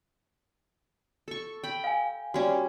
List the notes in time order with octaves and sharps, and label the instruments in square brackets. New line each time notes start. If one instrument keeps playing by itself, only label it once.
[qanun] A4 C#6
G5 B5
[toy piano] F5 G#5
[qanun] G3 C#4 [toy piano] F#4 D5